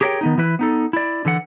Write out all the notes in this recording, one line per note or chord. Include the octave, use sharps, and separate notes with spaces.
G4 G#4 A#4 C#5 E5 G5
D#3 B3 D#4
E3 E4 B4
B3 D#4 A4
E4 D5
D3 E3 A4 F#5